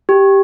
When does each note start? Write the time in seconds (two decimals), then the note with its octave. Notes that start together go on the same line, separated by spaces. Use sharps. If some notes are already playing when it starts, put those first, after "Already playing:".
0.09 G4